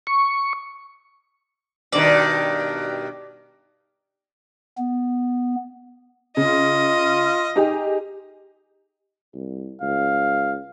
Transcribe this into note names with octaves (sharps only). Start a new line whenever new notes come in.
C#6
G2 B2 D#3 D5
B3
C#3 F4 D#5
D#4 G4 G#4
C2
C#2 F5